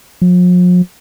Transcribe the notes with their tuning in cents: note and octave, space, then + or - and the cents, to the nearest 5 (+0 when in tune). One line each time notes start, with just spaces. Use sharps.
F3 +45